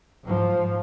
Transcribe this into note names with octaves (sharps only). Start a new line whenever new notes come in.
G#2 F3